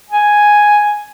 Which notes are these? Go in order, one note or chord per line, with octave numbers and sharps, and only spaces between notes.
G#5